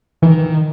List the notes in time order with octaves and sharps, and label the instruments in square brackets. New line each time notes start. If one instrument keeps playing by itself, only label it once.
[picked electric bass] D#3 [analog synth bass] E3